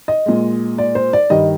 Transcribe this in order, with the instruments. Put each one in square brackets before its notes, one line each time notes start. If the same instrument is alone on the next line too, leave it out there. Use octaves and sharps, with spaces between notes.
[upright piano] D#5
A#2 G#3
D5
C5
D5
G2 D#3 G3 D#5